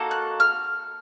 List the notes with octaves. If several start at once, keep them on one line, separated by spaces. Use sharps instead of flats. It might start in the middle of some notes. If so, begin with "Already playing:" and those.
Already playing: A#3 D#4 F#4 A4
F#6
F6